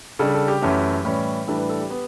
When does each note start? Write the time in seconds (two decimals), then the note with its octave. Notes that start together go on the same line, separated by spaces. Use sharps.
0.19 C#3 G3 D4 A4
0.34 A4
0.48 G4
0.62 F#2 E3 A3 C#4
1.05 A2 E3 G3 C#4
1.47 A2 E3 G3 D4 A4
1.58 B4
1.69 A4
1.79 G4
1.90 B3